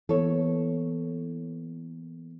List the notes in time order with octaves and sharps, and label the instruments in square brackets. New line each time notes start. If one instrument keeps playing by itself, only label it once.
[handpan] E3 A#3 B3 [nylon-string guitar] A4 C#5